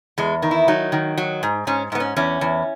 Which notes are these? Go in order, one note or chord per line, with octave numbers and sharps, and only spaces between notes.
E2 G#3
D#3
E4
F#3 D#4
D#3
F#3
G#2
G#2 C#4
G#2 B3
C#4
E2 C#4
E2